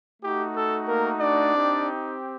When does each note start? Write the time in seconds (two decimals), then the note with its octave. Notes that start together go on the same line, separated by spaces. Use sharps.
0.22 A3 D#4 F#4 G4
0.55 A4
0.88 A#3 A#4
1.21 D4 D5
1.54 C4 D#4 G4